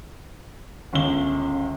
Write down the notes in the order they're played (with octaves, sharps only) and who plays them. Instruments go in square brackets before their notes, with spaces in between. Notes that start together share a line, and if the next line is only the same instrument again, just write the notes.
[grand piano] G1 C#2 G7 [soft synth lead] C#4